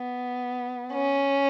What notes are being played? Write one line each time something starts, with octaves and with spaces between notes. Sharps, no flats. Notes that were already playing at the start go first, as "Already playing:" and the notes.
Already playing: B3
C#4